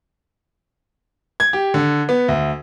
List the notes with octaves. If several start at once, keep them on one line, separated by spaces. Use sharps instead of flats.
G#6
G4
D3
B3
D2